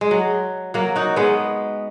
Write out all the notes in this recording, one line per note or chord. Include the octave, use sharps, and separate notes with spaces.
G#3
F#3
F#3 A#3
D#4 F#4
G#3 B3